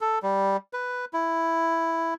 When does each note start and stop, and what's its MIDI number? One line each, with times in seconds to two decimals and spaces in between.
0.01 0.19 69
0.23 0.57 55
0.73 1.05 71
1.13 2.14 64